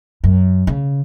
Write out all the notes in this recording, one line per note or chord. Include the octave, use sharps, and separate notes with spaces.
F#2
C#3